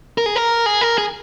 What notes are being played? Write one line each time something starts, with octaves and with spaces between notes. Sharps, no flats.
A#4
G#4
A#4
G#4
A#4
G#4